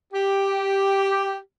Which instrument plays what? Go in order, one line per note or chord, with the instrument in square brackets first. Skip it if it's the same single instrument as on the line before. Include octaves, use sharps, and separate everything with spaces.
[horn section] G4